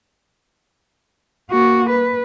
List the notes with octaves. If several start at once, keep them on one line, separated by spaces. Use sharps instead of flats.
A#3 F#4
B4